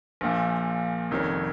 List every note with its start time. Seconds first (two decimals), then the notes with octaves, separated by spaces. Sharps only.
0.21 A#1 A#2 F3
1.11 F1 F2 D#3 G3 C#4